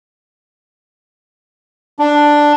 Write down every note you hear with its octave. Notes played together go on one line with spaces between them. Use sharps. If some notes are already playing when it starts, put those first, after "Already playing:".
D4